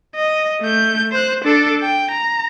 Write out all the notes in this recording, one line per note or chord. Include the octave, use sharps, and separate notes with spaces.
D#5
A3 G6
C5 F#6
D4 A4
G5
A#5